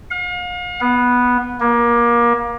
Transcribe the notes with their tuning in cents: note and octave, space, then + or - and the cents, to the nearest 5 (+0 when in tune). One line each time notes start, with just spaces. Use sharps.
F5 +40
B3 -5
A#3 +25